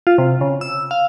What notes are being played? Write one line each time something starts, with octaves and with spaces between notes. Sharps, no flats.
F4
C3
C#3
E6
F5